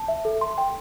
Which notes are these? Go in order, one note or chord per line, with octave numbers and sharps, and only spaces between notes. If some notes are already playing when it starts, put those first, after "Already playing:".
Already playing: A5
E5
A4
C6
G5